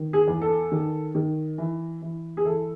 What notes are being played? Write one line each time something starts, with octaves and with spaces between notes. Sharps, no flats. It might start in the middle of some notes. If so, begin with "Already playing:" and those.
Already playing: D#3
G#4
E2
A4
D#3
D#3
E3
E3
G#4
E3 A4